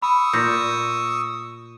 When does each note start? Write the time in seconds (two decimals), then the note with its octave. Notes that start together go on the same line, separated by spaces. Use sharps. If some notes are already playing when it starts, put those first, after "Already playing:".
0.02 B5 C#6 D#6 E6
0.33 A#2 G6 A#6 C#7